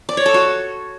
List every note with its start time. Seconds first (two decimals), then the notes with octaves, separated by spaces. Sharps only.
0.09 D5
0.17 C#5
0.26 A4
0.34 F#4